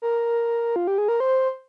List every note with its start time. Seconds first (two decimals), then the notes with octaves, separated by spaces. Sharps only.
0.02 A#4
0.76 F4
0.87 G4
0.98 G#4
1.08 A#4
1.20 C5